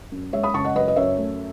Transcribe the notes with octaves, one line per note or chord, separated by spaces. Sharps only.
F#2
G#3 C#5 E5
B5 D#6
C#3 A5 C#6
D#5 F#5
F#2 B4 D#5
D#5
F#2 C#5 E5
A3